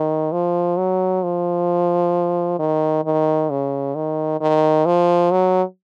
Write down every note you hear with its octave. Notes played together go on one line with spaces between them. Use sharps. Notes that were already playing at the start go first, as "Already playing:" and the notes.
Already playing: D#3
F3
F#3
F3
D#3
D#3
C#3
D#3
D#3
F3
F#3